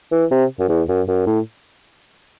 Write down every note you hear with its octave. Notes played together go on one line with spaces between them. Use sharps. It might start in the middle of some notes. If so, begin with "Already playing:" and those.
E3
C3
F#2
E2
F#2
F#2
A2